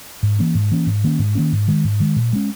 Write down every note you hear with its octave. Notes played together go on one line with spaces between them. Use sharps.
G#2
E3 A#3 C#4
G#2
E3 A#3 C#4
G#2
D#3 A#3 C#4
G#2
D#3 A#3 C#4
G#2
D#3 G#3
G#2
D#3 G#3
A#2
G#3 C#4